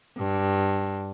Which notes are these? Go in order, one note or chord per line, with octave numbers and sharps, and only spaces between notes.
G2